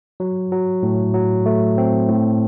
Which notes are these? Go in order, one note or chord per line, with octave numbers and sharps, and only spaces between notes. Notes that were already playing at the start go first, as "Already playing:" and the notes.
F#3
F#3
A2
F#3
A3
C4
A2